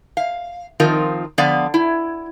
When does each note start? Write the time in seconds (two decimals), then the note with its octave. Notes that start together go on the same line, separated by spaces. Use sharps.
0.17 F5
0.80 D#3 F3 C4 D#4 F4 A#4
1.38 D3 F3 B3 D5 F5
1.74 E4